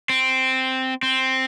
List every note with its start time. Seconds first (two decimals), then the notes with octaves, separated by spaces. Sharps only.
0.10 C4
1.03 C4